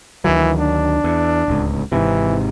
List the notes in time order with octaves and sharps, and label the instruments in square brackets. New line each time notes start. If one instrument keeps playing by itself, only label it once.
[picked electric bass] D2 D#3 F#3 [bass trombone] E3
[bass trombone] D4
[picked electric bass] E2
D1 C#2
[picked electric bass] G#1 G#2 C3 [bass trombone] E3